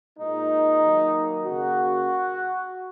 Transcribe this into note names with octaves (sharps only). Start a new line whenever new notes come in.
A#2 G#3 D#4
D#3 F#3 A#3
C#3 A#3 F#4